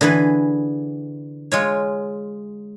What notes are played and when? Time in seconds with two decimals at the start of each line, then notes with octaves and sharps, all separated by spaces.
0.01 D3 E3 G#4 B4
1.52 G#3 F4 C#5